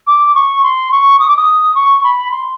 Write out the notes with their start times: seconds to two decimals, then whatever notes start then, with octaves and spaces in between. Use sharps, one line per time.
0.07 D6
0.35 C#6
0.63 C6
0.92 C#6
1.20 D#6
1.28 D6
1.37 D#6
1.75 C#6
2.04 B5
2.31 C6